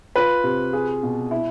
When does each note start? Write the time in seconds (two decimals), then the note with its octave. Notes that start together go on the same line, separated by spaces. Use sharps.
0.16 F4 B4
0.44 C3
0.73 G#4
1.03 B2
1.31 E4